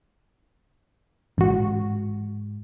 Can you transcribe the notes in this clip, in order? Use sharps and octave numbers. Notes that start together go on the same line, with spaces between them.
A1 G#2 F#4